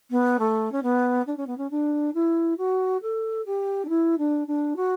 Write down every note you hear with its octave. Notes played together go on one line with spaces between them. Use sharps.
B3
A3
C#4
B3
D4
C#4
B3
C#4
D4
E4
F#4
A4
G4
D4
E4
D4
D4
F#4